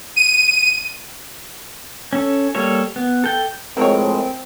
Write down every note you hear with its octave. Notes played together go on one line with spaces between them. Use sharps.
D#7
C#4 A4
G3 A#3 A4 C#5
B3
A4 G5
A2 F3 F#3 G#3 A#3 C4 A#4 C#5